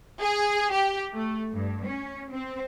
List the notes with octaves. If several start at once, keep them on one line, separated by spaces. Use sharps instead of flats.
G#4
G4
A3
G2
C#4
C4